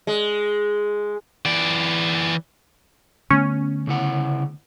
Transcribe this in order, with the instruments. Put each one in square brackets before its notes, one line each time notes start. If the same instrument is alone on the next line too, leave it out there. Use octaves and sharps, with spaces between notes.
[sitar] G#3
[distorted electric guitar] E3 D5
[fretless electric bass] D3 A3 B3 [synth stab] C#4
[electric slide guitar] C#3 E4 F#5